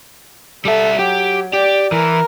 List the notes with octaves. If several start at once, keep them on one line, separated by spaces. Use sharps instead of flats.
G3 A4 E5
F#3 G4
G4 D5
E3 A#4